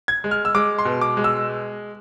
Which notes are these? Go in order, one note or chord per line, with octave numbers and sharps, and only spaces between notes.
G#6
G#3
F6
E6
G#3 D6
C6
B2
D6
G#3
E6